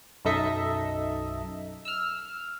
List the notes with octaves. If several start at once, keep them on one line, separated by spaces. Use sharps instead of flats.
B1 F#2 D#4 A4 D#5 E5
E6 F6